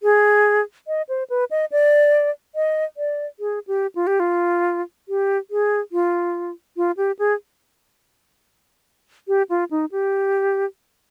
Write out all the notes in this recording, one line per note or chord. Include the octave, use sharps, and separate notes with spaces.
G#4
D#5
C5
B4
D#5
D5
D#5
D5
G#4
G4
F4
G4
F4
G4
G#4
F4
F4
G4
G#4
G4
F4
D#4
G4